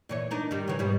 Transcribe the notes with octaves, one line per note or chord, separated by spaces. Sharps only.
A#2 E3 C#5
D4 D#4 A#4
D#3 G3
C#3 E3
G#2 B2 G3